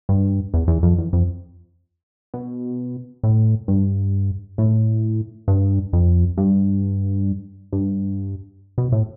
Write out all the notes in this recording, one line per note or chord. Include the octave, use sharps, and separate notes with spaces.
G2
E2
E2
F2
E2
F2
B2
A2
G2
A2
G2
F2
G2
G2
B2
A2